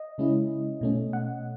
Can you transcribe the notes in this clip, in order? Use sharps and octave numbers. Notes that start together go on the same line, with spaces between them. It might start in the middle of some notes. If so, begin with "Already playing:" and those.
Already playing: D#5
C#3 G#3 C#4 E4
B2 A3 C#4
F#5